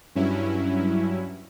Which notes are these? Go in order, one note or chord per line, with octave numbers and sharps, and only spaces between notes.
G2 F#3 C#4 E4